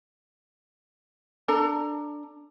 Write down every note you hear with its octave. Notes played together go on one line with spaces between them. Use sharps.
D4 A4 A#5